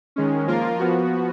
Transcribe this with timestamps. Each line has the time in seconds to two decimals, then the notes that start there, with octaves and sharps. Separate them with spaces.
0.16 D#3 G#3 C#4
0.47 F3 A#3 F4 A#4
0.79 F3 B3 F#4